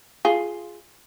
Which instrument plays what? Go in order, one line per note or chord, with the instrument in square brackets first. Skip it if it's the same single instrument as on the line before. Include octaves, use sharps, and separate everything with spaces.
[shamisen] F4 G#4